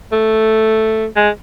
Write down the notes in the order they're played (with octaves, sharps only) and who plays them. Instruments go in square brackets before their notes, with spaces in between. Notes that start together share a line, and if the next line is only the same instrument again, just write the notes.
[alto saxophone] A3
G#3